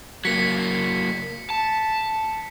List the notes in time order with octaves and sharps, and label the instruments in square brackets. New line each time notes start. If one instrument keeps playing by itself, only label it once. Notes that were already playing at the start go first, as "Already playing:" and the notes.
[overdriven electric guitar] F#3 A#3 [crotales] B6 C#7
[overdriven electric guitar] A5